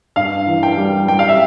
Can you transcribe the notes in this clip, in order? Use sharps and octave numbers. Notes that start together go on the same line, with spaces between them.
G2 F5
E3
G5
G3
G3 G5
F5
E5